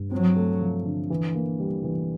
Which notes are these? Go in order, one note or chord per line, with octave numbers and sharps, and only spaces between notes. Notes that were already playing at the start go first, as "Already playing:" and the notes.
Already playing: G2
F#3 C4
A3
F3
D3
E3
A#3
G3
E3